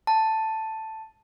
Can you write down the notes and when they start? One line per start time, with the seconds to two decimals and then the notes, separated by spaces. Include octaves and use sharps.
0.07 A5